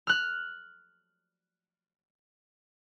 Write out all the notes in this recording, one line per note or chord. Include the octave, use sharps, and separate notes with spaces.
F6 F#6